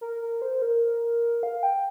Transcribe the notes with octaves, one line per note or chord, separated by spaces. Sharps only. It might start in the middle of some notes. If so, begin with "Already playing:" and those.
A#4
A#4
C5
A#4
F5
G5